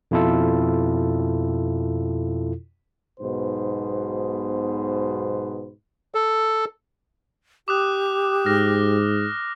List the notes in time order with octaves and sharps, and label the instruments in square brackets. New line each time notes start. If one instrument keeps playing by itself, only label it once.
[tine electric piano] F2 B2 E4 F4 A4
[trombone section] B1 G#2 B2 B4 C5
[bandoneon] A4
[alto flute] G4 [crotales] D6 D#6 F#6
[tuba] G#2 [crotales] F6 A#6